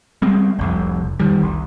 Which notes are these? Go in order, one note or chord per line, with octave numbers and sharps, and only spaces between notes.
G3 G#3 C4
F1 C2 F2
F1 D#3 G3
C2